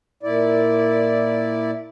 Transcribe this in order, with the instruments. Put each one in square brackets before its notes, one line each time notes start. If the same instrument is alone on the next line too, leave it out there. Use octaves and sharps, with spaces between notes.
[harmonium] A#2 E4 D5